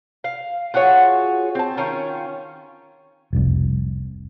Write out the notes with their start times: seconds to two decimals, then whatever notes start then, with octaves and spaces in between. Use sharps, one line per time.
0.24 F5
0.74 F4 F#4 G#4 C#5
1.55 C4 A5
1.77 D#3 C#4 F4 C#5
3.33 F1 C2